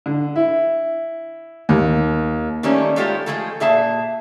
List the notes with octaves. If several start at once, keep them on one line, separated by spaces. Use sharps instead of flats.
D3
E4
D#2
D#3 G3 A3 A#3 C#4
G#3 A3 D#4 F4 G4 A4
F3 F#3 G#3 A3 G#4 A4
A#2 G#4 E5 A5